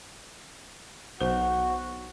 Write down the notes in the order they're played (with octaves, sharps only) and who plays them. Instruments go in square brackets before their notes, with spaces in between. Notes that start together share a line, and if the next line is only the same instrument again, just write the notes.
[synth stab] B1 [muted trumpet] F#4 [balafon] C5